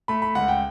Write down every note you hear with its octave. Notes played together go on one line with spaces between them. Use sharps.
A3 B5
B5
C#2 F#5
G5